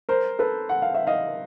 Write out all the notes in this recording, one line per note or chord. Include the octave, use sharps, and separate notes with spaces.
A#4 C5
A4 B4
F#5
F5
E5
D#5 F5